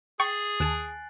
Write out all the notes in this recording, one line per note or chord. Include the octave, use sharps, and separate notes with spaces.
G#4 G5 C#6 A6 C7 F#7
D#2 G#5 A5 F#6